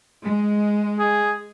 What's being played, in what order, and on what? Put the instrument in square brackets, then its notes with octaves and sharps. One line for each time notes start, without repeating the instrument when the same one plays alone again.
[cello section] G#3
[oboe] G#4